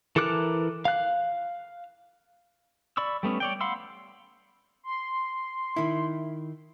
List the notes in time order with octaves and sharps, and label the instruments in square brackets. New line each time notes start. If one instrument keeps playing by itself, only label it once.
[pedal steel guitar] E3 A4 A#4 D6 F#6
F5 F#6
D5 B5 C#6 E6
G3 A3 B3 C#4
C#5 D5 G5
F5 F#5 B5 C6 E6
[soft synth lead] C6
[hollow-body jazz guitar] D#3 E4